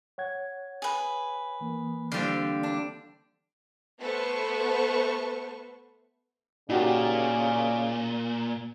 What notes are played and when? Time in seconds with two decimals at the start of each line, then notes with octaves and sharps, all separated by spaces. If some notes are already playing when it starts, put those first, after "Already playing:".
0.18 C#5 F#5 G#6
0.82 G#4 B4
1.61 E3 A#3
2.12 D3 G3 C4 F5
2.63 D4
4.00 A3 B3 A4 B4 C5 C#6
6.69 A#2 C#3 D#4 F#4 G4 D5